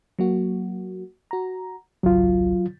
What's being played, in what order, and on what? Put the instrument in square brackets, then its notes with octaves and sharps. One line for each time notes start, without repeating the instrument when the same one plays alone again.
[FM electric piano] F#3 A#3 F#4
F#4 A#5
[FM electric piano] G#1 C#2 [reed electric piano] F#3 F4